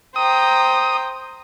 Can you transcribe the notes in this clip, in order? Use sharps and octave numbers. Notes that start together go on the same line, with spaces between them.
C5 G5 A#5 D#6